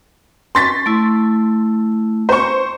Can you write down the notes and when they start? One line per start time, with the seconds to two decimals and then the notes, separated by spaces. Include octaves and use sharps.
0.55 C6 C#6 A6 B6
0.86 A3 E4
2.29 C5 C#6